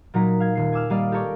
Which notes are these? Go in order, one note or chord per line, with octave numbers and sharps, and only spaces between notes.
A#2 F#3 D#4 A#5 B6
F5 G#6
D#1 C7
G#5 D6 E6 F6
G3 A#3 D5 D#5 F5
G4 A4 A#4 C#5 D5